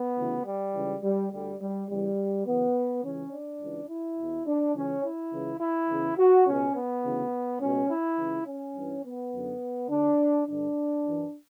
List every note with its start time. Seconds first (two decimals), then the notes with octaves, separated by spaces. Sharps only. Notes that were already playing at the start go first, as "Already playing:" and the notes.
Already playing: B3
0.17 D2 C#3 E3
0.46 G3
0.75 C#2 C#3 E3
1.03 G3
1.31 D2 D3 G3
1.60 G3
1.89 E2 C#3 E3 G3
2.46 F#2 C#3 E3 B3
3.03 C#2 C#3 E3 C#4
3.32 D4
3.61 C#2 C#3 E3
3.89 E4
4.18 E2 B2
4.46 D4
4.75 C#2 C#3 E3 C#4
5.03 E4
5.32 C#2 C#3 E3
5.60 E4
5.90 E2 C#3 E3
6.18 F#4
6.46 C#2 B2 C#4
6.75 B3
7.04 D2 C#3 E3
7.61 C#2 B2 C#4
7.90 E4
8.17 C#2 C#3 E3
8.47 C#4
8.75 G2 E3
9.04 B3
9.33 F#2 D3
9.89 D2 D3 D4
10.46 G2 D3 D4
11.04 F#2 E3